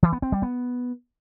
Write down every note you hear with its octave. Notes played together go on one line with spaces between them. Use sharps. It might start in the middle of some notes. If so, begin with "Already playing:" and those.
E3
B3
C4
G3
B3